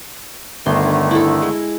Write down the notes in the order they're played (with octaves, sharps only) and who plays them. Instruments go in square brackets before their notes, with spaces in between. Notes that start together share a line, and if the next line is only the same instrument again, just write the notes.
[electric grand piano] G1 [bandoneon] D3 D#3 A3 [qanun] C6
[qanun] E4 A4
G#3